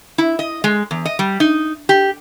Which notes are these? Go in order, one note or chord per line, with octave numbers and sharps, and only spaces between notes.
E4
D#5
G#3
E2
D#5
G3
D#4
G4